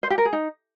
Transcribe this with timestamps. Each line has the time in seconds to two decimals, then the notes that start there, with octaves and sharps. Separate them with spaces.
0.03 C5
0.10 G4
0.18 A#4
0.25 G#4
0.33 D#4